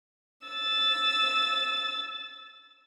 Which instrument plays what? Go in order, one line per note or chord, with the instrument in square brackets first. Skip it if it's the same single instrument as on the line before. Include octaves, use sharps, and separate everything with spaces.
[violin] E6 A6